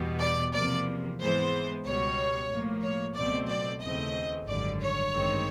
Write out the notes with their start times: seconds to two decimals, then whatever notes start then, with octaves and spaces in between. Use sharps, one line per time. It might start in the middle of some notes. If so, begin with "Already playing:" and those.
Already playing: E2 B2 G3 B3
0.20 D5
0.53 E2 C3 F3 A#3 D5
1.19 G#2 E3 G#3 B3 C5
1.85 C#2 B2 G3 C#5
2.50 A2 F3 A#3
2.83 C#5
3.16 C#2 B2 F#3 A3 C4 D5
3.49 D5
3.82 D#2 C#3 E3 A3 C4 D#5
4.47 G#1 F#2 D3 G3 D5
4.80 C#5
5.13 A1 G2 D#3 G#3 C4